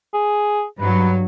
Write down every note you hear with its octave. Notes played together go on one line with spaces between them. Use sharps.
G#4
G2 F#3 B4